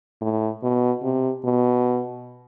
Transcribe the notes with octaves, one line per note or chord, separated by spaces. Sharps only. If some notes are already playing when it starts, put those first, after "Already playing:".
A2
B2
C3
B2